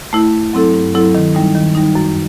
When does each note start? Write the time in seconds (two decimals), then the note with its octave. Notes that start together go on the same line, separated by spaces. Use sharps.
0.13 A3 E4
0.33 G2
0.53 F#3 C4 E4 A4
0.74 G2
0.94 F#3 C4 E4 A4
1.15 D#3
1.35 G3 D#4
1.55 D#3
1.75 G3 D#4
1.95 F#2